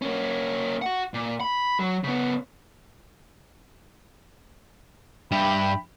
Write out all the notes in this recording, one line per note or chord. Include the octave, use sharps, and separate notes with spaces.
A#3 C#4
F#4 F#5
A#2
B5
F#3
C#3 B3
G2 G4 E5 G5 B5